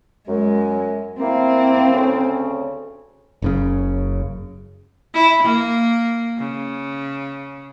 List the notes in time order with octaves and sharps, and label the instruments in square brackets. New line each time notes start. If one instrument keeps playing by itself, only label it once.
[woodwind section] F#2 [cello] G#3
[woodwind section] A#3 E4 [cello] C4
[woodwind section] D2 C#3 C#4
[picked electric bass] F#1 F#2 C#3
[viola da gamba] E4
A#3
C#3